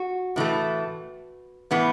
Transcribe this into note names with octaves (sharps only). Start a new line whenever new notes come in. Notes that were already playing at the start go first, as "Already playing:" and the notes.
Already playing: F#4
A2 E3 A3
A2 E3 B3